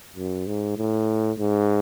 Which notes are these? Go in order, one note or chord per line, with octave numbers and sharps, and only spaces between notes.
F#2
G#2
A2
G#2